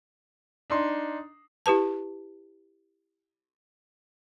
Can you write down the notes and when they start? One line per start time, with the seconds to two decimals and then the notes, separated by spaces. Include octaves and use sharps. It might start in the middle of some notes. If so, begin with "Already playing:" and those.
0.70 D4 D#4 C6
1.66 E4 G4 B4 A5